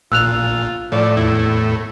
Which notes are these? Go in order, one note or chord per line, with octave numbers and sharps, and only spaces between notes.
A#1 A#2 F4 E6 F#6 F7
A2 F3 D5
E2 E4